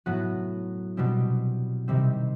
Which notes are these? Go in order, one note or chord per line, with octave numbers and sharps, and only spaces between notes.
A2 F#3 B3 F#4
B2 G3 C4
C3 D#3 G3 C4